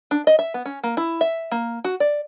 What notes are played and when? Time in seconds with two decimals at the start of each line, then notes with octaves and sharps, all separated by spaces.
0.11 D4
0.27 D#5
0.39 E5
0.54 B3
0.66 C#4
0.83 A#3
0.97 E4
1.21 E5
1.51 A#3
1.84 F#4
2.00 D5